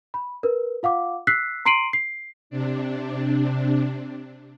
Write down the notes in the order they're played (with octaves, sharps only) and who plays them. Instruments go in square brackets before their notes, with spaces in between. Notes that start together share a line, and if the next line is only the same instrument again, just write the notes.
[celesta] B5
A#4 B4
F4 F5 F#5 D6
E6 F#6 B6 C7
A#5 C6 C7 D7 D#7 F#7
C7
[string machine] C3 D4